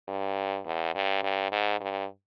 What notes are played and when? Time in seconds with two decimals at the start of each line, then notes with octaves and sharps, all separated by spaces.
0.08 G2
0.66 E2
0.95 G2
1.23 G2
1.52 G#2
1.80 G2